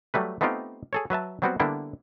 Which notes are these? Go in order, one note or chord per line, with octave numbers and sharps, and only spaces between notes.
F#3 G3 A3 B4
A3 B3 C4 D#4 F4 G4
G#4 A4 C#5
F#3 B4 E5 A5
F#3 G3 B3 C4 F#4
D3 G3 A#3 B3 D4 E4